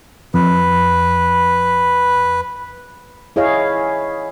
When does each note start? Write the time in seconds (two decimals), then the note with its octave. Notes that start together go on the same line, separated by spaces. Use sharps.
0.34 F2 B4
3.36 E4 G#4 C#5 D#5 F5